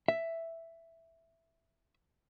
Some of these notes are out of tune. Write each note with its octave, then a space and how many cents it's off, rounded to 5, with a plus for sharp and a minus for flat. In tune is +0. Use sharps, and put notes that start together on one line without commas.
E5 +5